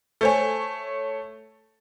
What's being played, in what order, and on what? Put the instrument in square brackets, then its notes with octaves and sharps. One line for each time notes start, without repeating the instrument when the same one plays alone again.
[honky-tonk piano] A3 C#5 [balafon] A4 C5 G#5